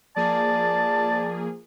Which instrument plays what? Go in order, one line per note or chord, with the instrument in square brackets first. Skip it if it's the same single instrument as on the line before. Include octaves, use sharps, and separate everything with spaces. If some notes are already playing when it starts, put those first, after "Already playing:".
[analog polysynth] F3 A#3 G#4 [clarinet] D5 [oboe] A5